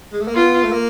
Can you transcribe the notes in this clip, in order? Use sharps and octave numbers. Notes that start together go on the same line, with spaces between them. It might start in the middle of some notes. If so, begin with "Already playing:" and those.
G#3
A3
A#3
B3 F4
A3
A#3